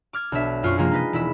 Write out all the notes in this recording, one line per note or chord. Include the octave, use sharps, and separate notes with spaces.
D6 F6 G#6
B1 D4 E5
F#2 F4 C5 C#6
C3 F3 G#3 A#3 F4
D#4 B4 D#5
E1 E4 B5 E6